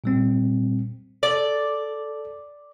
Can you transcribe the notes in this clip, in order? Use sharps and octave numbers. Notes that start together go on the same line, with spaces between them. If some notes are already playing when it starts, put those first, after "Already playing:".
A#2 G3 C4
A4 D5